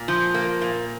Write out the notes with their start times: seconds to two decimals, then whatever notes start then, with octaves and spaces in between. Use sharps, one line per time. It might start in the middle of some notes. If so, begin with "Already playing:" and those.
Already playing: A#2
0.08 F3
0.34 A#3
0.62 A#2